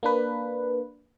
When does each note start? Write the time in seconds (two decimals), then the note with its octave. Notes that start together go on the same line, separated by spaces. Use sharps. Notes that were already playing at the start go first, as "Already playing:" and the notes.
0.03 A#3 D4 B4